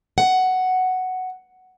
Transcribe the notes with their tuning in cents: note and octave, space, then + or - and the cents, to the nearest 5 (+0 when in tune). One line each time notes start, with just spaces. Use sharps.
F#5 +5